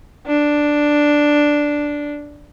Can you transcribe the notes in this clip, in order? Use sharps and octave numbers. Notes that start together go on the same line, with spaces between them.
D4